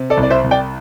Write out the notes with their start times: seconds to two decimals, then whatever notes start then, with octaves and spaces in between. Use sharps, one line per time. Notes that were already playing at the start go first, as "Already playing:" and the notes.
Already playing: C3
0.10 A4 D5
0.17 C2
0.23 D5
0.31 C5 E5
0.44 C2
0.51 D5 G5